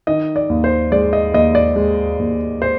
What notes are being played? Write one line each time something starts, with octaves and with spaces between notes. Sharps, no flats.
D#3 D#5
D5
D#2
C5
G#3 D5
D#5
D#2 D#5
D5
G#3
D#2
C5